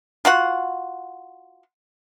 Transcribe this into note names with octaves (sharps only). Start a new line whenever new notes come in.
F4 F#4 F#5